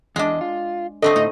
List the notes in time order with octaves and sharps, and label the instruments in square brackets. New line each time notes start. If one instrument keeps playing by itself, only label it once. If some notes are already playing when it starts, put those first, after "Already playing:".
[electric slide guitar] E2 D#5 [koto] G#3 D4
[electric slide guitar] F4
[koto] D3 A3 C4 [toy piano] A4 C6 [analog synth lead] D#5
[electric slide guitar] A2 [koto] D#4